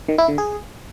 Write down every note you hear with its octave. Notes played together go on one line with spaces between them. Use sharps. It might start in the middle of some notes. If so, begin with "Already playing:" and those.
D#3
E4
D3
G#4